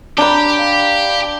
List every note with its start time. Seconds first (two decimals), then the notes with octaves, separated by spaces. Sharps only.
0.18 D4 G4 G5 A#5 B5
0.59 F5